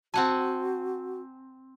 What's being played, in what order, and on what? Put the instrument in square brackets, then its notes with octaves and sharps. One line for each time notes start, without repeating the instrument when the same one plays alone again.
[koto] C4 F#5 G#5 [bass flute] F#4 [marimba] A5